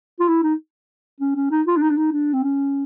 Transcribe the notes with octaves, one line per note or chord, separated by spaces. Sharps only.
F4
E4
D#4
C#4
C#4
D#4
F4
D4
D#4
D4
D#4
D4
C4
C#4